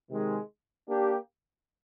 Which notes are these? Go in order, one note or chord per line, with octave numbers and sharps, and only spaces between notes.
C3 D#3 G#3
A#3 D4 G4